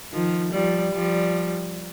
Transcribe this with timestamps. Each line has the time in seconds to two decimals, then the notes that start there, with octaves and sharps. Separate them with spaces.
0.12 D#3 F3
0.52 F3 G3
0.92 F3 G3